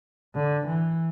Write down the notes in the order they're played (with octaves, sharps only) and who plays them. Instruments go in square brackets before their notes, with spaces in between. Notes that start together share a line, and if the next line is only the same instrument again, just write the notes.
[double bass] D3
E3